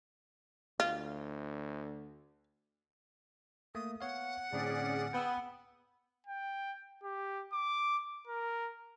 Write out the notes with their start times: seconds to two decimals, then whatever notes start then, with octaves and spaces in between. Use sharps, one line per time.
0.80 D2 F4
3.75 A3 A#3 D#6
4.01 B3 C#5 F5 F#5
4.53 A2 D3 C4 C#4 G#4 D5
5.13 B3 G5 D#6 E6
6.27 G5
7.03 G4
7.53 D6
8.27 A#4